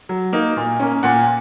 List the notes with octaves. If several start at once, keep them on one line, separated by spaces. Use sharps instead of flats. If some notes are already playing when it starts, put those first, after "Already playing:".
F#3
A#3 D#4
A#2
A#3 C#4
A#2 F#5